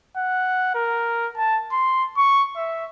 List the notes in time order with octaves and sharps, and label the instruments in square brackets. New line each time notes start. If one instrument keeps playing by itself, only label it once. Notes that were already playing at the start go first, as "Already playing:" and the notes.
[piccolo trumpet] F#5
A#4
A5
C6
C#6
E5